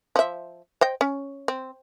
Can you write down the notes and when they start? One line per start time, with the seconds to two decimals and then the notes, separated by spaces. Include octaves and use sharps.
0.16 F3 E5
0.81 C5 D#5 G5
1.01 C#4
1.48 C4